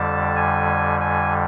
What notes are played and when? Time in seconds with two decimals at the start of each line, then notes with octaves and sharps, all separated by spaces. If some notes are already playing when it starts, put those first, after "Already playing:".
Already playing: F2 D3 G3 A5
0.36 G#5
1.00 G#5